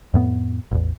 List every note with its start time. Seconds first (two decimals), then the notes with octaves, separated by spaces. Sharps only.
0.14 F2 A2 B3
0.71 A1 E2